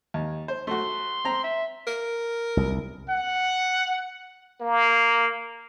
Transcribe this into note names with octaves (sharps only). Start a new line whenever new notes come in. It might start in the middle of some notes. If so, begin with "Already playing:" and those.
D#2
C5
A3 F#4 C6
C4 A#5
E5
A#4
C2
F#5
A#3